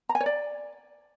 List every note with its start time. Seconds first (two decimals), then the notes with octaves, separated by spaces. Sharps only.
0.09 A#5
0.15 G#5
0.20 C#5
0.26 D5